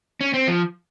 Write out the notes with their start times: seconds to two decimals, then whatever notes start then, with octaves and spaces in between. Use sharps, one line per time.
0.21 C#4
0.34 C4
0.47 F3